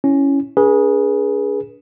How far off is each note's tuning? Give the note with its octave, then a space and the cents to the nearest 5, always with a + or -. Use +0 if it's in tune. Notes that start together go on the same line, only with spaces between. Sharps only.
C#4 +0 E4 +0
D4 -35 G#4 +0 B4 -35